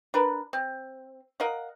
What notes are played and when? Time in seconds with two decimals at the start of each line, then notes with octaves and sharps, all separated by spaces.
0.14 D4 A#4 B4
0.53 C4
1.40 A#4 D#5 F5 F#5